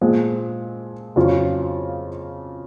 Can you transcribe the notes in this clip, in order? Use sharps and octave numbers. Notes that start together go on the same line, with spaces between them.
A#2 F3 G#3
F2 C#3 F#3 C#4 F4